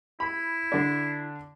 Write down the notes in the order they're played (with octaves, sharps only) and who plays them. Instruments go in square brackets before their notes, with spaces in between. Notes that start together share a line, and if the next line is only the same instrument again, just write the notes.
[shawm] E4 [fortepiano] B5
[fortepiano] D3 D4